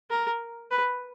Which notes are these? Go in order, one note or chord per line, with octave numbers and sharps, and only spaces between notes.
A#4
B4